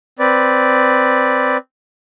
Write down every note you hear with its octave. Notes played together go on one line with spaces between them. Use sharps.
C4 B4 D5